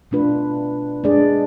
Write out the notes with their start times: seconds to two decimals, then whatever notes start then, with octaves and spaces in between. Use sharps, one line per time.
0.11 B2 A3 D4 F4 B4
1.04 G#3 D4 G#4 D5